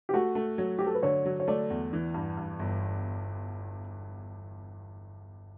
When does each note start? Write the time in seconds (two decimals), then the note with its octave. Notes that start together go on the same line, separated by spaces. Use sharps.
0.09 G4
0.14 A3 F#4
0.35 A3
0.58 F#3
0.79 F#3 G4
0.86 A4
0.95 B4
1.03 D3 C#5
1.25 F#3
1.40 C#5
1.48 A3 D5
1.70 E2
1.93 E3
2.14 G2
2.37 G2
2.59 G1